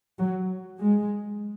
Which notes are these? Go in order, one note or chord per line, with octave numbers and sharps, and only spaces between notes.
F#3
G#3